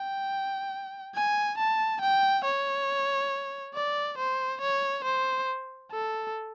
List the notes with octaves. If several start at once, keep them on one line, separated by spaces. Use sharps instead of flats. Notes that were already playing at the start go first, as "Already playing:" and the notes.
Already playing: G5
G#5
A5
G5
C#5
D5
C5
C#5
C5
A4